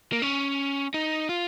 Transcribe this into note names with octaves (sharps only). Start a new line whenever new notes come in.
A#3
C#4
D#4
F4